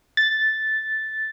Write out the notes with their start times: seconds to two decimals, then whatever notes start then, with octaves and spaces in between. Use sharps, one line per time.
0.17 A6